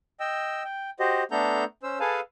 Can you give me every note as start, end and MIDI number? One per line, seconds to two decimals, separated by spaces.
0.20 0.63 75
0.20 0.63 79
0.20 0.63 88
0.64 0.90 79
1.00 1.23 66
1.00 1.23 67
1.00 1.23 72
1.00 1.23 75
1.31 1.64 57
1.31 1.64 59
1.31 1.64 62
1.31 1.64 69
1.31 1.64 82
1.31 1.64 91
1.83 1.99 61
1.83 1.99 72
1.83 1.99 88
2.00 2.20 68
2.00 2.20 69
2.00 2.20 71
2.00 2.20 77
2.00 2.20 80
2.00 2.20 81